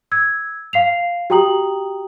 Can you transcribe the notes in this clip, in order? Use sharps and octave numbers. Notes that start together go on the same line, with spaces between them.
E6 G#6
F5 C7 F7
F#4 G4 G5 A#5 D#6 F#7